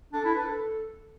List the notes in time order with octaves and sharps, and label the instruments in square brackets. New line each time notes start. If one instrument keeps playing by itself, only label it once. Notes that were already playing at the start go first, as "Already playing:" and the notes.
[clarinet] D4 [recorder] A4
[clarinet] E4
[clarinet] D4 [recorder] B4
[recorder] A4